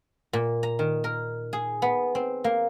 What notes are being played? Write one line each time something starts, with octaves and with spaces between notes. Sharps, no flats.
A#2
A#5
D#3
A#4
G#4
B3
C4
A#3